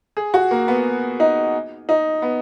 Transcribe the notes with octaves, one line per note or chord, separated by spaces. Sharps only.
G#4
F#4
A#3
B3
D#4
D#4
B3